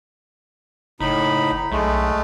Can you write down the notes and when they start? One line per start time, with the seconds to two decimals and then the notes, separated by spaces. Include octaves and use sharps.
1.00 F#1 A2 D#4 B5
1.72 B1 G#3 A3